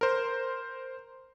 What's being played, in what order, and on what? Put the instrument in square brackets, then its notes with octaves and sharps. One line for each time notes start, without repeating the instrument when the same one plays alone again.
[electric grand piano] A#4 C5